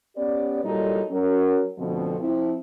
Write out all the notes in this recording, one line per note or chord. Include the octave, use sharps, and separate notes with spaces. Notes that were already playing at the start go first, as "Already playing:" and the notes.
B3 C#4 G4 D5
A#2 F#3 G3 D#4 E4 A4
F#3 C#4 A#4
F2 B2 D3 F3 A3 C4
F3 C4 E4